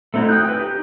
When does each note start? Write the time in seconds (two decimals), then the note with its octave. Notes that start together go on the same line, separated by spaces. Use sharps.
0.14 A3 C4 D#4 E4 F#4
0.29 G5 D#6 F#6 G6
0.45 B4 G5
0.59 D#4 G4